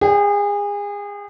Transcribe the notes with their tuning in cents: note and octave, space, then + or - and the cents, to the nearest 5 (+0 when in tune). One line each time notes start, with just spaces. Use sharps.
G#4 -30 D5 +0 G5 +0